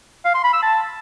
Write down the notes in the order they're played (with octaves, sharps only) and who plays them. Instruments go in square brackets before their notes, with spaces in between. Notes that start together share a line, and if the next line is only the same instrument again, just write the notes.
[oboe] F5
C6
B5
E6
A5